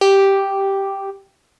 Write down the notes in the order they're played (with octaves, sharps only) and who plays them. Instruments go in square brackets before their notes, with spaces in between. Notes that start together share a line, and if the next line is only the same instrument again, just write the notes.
[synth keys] G4